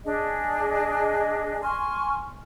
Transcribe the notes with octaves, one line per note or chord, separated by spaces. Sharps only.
D4 G#4 D#5
G#5 C6 C#6 F6